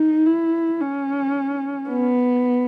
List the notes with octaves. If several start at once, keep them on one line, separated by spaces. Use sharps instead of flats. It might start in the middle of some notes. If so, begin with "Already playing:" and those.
Already playing: D#4
E4
C#4
B3